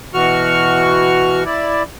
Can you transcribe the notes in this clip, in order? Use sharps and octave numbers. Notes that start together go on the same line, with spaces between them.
B2 E3 F#4 C#6 F6
E4 D5